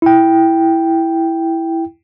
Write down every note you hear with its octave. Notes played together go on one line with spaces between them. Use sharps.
E4 G5